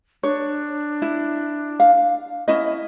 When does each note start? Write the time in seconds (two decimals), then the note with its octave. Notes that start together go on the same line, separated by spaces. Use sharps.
0.23 D4 C#5
1.02 E4
1.80 F5
2.48 C#4 E4 D#5